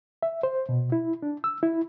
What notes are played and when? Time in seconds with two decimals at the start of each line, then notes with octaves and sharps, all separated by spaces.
0.23 E5
0.43 C5
0.69 B2
0.92 E4
1.22 D4
1.44 E6
1.63 E4